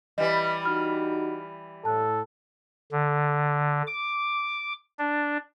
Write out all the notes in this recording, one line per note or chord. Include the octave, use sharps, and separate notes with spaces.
E3 G3 D#5
D#4 F#4 F6
A2 A4 A5 F#6
D3
D6
D4